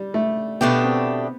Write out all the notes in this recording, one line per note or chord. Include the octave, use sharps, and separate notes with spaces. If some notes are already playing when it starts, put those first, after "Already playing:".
Already playing: G3
A3
B2 A3 B3 D4 G4
C4